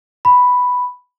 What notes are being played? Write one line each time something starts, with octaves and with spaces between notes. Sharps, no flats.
B5